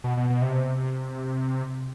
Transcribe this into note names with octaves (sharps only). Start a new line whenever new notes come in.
B2
B2
B2
C3